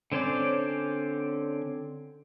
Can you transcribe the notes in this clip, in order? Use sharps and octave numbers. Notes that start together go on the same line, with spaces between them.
D3 C4 C#4 C5 D5